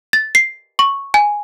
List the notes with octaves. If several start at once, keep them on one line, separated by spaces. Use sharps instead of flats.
A6
C7
C#6
G#5